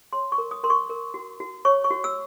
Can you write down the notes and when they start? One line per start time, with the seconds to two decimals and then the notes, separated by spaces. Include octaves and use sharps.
0.13 C#5 C6
0.32 C#6
0.38 A#4
0.51 D#6
0.64 A#4 C6
0.70 C#6
0.90 A#4
1.14 F#4
1.40 F#4
1.65 C#5 C#6
1.84 C#6
1.91 F#4
2.04 E6